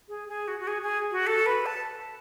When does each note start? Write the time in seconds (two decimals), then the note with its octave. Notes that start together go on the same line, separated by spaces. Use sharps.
0.09 G#4
0.28 G#4
0.48 F#4
0.60 F#4
0.67 G#4
0.82 G#4
1.12 F#4
1.27 A4
1.46 B4
1.66 A5